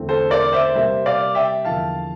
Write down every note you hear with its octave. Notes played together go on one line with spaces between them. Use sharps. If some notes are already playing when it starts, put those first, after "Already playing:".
Already playing: E2 D3 A3 C4
A4 C5
A#4 D5
C5 E5
C3 G3 A#3 C5 E5
D5 F5
E5 G5
E2 D3 F3 A#3 F5 A5